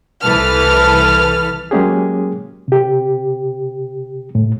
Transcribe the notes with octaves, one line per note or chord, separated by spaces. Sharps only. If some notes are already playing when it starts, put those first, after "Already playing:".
C2 E3 A4 B4 F6
F#3 G#3 A#3 C#4 G4 G#4
C3 G4
A2